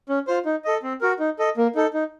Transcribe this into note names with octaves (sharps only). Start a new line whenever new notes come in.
C#4
F4 C5
D#4
A4 D#5
C4
F#4 A#4
D#4
A4 D#5
A#3
D#4 A4
D#4